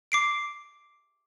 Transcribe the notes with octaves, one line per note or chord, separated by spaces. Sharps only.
D6 C7 D7